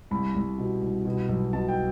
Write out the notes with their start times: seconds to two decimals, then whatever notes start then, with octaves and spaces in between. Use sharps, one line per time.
0.11 C2 B5
0.35 C2
0.58 B2
0.82 C2
1.05 B2
1.29 B1
1.53 B2 A5
1.68 G5